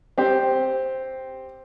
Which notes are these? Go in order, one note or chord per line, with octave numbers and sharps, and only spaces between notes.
C4 G4 C5